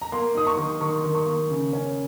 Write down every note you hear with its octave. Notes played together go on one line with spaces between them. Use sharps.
A#5
A#3 C6
D#4 D#6
C#6
D#3
D#3 C#6
D#3
C#6
A#3
C#3
C#4